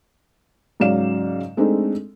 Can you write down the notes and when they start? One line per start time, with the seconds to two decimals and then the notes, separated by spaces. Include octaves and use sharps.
0.80 G#2 C#3 F#3 D5 F5 E7
1.57 G#3 A3 C4 D4 D#4